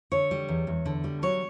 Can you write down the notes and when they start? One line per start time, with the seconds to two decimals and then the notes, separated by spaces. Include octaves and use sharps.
0.12 D3 C#5
0.31 G3
0.49 E2
0.67 E2
0.85 D3
1.04 G3
1.22 F#3 C#5